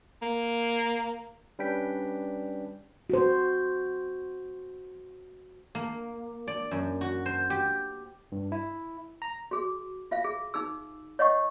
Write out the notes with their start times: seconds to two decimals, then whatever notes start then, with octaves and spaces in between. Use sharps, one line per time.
0.22 A#3
1.59 G3 C#4 D4 B4 G5 B6
3.10 F#4 C5
5.75 A#3
6.48 D5
6.71 F#2
7.01 F#4
7.26 C5
7.50 G4
8.32 G2
8.52 E4
9.22 A#5
9.51 F#4 G#4
10.11 F4 E5 F5
10.24 G#4
10.54 D#4 G#4 E6
11.19 C#5 D#5 F#5 C#6